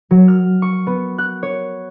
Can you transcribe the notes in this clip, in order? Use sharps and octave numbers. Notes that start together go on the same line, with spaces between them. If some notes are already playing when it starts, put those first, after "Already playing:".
F#3
F6
C#6
B3
F#6
C#5